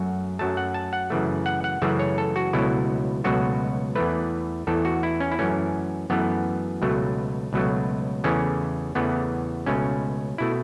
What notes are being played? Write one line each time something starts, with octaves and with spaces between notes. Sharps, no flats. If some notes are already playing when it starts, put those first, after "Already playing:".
Already playing: F#2 F#3 A3 F#4
F#2 F#3 A3 A5
F#5
A5
F#5
F#2 C#3 E3 A3
F#5
F#5
F#2 C#3 E3 A3 E5
C#5
A4
F#4
C#2 B2 F#3 A3 E4
C#2 B2 F#3 A3 F#4
E2 E3 A3 B4
E2 E3 A3 A4
F#4
E4
C#4
E4
F#2 E3 A3 C#4
F#2 E3 A3 B3
C#2 B2 F#3 A3
C#2 B2 F#3 A3
E2 C#3 E3 A3 C#4
E2 C#3 E3 A3 B3
C#2 B2 A3 C#4
B2 A3 E4